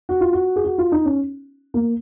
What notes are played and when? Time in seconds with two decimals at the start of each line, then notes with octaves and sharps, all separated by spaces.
0.09 F#4
0.21 F4
0.33 F#4
0.56 G#4
0.64 F#4
0.78 F4
0.92 D#4
1.05 C#4
1.74 A#3